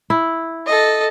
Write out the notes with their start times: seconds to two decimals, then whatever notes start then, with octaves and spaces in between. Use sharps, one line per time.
0.10 E4
0.66 A4 D#5